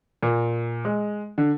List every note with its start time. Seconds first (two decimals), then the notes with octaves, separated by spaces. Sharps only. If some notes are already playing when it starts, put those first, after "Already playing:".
0.23 A#2
0.85 G#3
1.38 D3